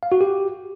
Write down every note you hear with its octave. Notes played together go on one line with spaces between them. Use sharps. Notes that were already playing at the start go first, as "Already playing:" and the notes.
F5
F#4
G4